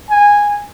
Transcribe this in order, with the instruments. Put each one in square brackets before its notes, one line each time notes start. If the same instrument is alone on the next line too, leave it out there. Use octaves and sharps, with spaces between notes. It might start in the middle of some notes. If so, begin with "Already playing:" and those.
[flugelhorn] G#5